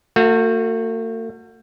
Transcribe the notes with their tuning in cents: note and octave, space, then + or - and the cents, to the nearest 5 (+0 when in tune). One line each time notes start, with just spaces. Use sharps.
A3 +45 F#4 -20